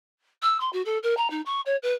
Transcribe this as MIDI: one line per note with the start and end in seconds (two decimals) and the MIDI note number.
0.42 0.57 88
0.60 0.69 84
0.73 0.82 66
0.85 0.98 69
1.03 1.14 70
1.17 1.30 82
1.30 1.41 63
1.45 1.60 85
1.66 1.76 73
1.82 1.93 71